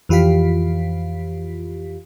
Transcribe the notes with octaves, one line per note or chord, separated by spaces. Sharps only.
F2 E3 F4 G4 F5 B6